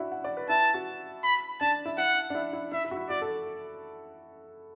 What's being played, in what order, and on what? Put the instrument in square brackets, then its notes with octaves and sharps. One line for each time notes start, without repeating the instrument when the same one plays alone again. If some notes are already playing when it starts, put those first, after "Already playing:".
Already playing: [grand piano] D4 E4 F#4
F#5
D5
B4
[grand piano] E4 [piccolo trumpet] A5
[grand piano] F#4
[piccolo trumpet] B5
[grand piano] D4 [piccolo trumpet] A5
[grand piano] E4
[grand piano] E4 [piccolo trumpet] F#5
[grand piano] D4
E4
E4
[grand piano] E4 [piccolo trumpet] E5
[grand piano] E4
F#4
E4
[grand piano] F#4 [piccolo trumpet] D5
[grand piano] A4